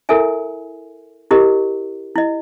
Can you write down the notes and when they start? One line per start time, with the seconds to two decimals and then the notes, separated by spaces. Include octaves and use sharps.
0.09 E4 A4 A#4 E5 G#5
1.31 E4 G4 A#4 D#5
2.16 E4 D#5